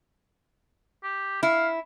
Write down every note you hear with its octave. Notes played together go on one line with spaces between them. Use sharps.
G4
E4 F5